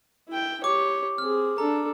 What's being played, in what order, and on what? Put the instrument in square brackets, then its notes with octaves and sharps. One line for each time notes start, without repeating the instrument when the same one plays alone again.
[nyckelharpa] E4 G5
[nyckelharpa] G4 C#5 [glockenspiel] D6
[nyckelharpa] C4 G#4 [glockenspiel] F6
[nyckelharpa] D4 A4 [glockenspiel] A#5